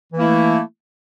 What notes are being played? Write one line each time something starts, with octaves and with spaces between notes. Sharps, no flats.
E3 A3 A#3 E4